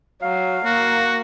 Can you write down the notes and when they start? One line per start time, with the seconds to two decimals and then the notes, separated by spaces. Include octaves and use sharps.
0.22 F#3 F5
0.65 A#3 F#4